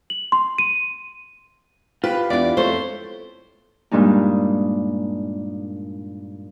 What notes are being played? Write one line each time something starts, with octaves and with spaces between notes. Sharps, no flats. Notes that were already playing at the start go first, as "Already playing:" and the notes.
F#7
C6
D#7
F4 G4 B4
E2 D4 D5
F2 A3 C5 C#5
G2 A#2 G#3 D4 D#4